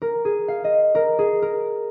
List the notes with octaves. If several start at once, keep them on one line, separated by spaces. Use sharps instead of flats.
A#4
G#4
F5
D#5
A#4
G#4
A#4